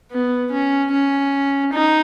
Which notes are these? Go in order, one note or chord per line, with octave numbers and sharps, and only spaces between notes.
B3
C#4
C#4
D#4